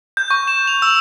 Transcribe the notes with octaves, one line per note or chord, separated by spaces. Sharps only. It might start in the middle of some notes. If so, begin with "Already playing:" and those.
G6
C#6
E7
F7
E6